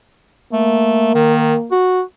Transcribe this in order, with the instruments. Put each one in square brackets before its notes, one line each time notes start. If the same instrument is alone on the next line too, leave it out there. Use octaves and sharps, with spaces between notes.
[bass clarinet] A3 [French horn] A#3
[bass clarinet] D#3
F#4